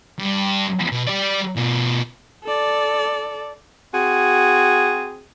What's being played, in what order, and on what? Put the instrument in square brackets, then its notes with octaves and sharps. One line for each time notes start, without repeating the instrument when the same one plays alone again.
[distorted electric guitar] G2
B2
G3 D5
B2 F4
[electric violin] A4 D5
[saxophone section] C4 F#4 G#4